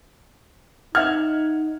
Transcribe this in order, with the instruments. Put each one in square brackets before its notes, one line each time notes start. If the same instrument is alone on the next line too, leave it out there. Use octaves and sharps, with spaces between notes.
[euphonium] D#4 [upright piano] E5 F#5 G#6 [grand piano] F6